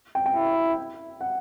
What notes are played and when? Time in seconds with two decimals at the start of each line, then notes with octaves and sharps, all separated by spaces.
0.15 G5
0.26 G5
0.35 E4
1.21 F#5